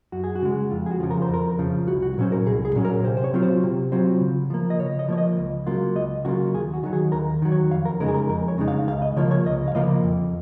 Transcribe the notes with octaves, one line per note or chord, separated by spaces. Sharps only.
F#2 F#4
G#4
F#4
C#3 G#3
F2 F4
G#4
F#4
C#3 F3
A#4
C5
F2 A#4
C#3 F3
C2 F#4
F#4
A#2 F#3 C#4 C5
A#4
C2 G#4
G#4
A#2 F#3 C#4
A#4
C3 C5
C5
C#5
F#3 C4 F4
C5
C3
F#3 C4 F4 C5
C#3
F3 A#3
D#5
C#3 C#5
D#5
F3 A#3 C#5
D#5
C#2
C#3 F#3 A#3 F4
C#2 D#5
C#3 F#3 A#3 F4 F#4
D#2 G#4
F#4
D#3 F#3
G#4
D#2 A#4
D#3 F#3
C#5
F2 F5
A#4
C#3 G#3 D#4 A#4
G#4
A#4
F2 A#4
C#5
C#3 G#3 D#4
F5
C#2 F5
D#5
C#3 F3 A#3 F4 C#5
C#5
C#2 D#5
F5
C#3 F3 A#3 F4 D#5
F2